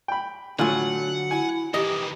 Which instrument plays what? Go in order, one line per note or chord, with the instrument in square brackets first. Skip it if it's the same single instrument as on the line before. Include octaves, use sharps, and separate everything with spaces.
[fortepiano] G5 B5
[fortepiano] A2 F4 G#5 [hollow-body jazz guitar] D3 F#3 [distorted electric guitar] F#5
[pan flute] E4 [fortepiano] G#5
[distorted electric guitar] D#3 E3 [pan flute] G4 [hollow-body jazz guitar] D#5